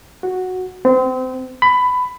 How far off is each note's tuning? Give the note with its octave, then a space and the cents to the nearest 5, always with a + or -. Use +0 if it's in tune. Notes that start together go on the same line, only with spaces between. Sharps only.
F#4 -5
C4 -30
B5 +15